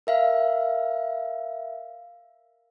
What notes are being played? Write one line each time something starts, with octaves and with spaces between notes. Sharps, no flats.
A#4 E5 F5